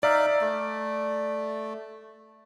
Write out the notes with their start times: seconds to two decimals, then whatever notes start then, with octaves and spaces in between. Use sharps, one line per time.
0.03 D#4 D5 E5 F5
0.41 A3